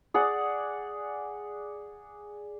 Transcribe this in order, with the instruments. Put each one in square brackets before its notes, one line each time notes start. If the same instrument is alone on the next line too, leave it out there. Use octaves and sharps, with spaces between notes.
[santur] G#4 D5 F#5